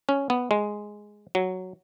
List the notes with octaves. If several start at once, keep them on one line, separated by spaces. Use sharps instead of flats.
C#4
B3
G#3
F#3